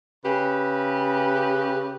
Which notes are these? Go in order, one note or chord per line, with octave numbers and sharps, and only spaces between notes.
C#3 G4 B4